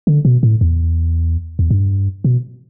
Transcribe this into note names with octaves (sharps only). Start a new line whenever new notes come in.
D3
B2
A2
E2
E2
G2
B2